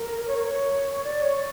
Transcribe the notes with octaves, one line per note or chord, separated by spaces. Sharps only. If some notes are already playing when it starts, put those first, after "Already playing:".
Already playing: A#4
C#5
A#4
C#5
D5
C#5
C#5